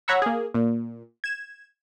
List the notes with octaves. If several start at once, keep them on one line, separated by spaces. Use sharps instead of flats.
C#5 F#5 A#5 B5 C#6 E6
A#3 G#4
A#2
G#6 E7